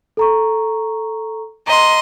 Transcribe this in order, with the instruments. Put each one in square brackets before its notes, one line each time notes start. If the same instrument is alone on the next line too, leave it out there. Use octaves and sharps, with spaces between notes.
[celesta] A4 A#5 C#6
[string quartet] D#5 C6 [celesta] A#5